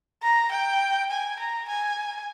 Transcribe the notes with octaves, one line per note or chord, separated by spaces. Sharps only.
A#5
G5
G#5
A#5
G#5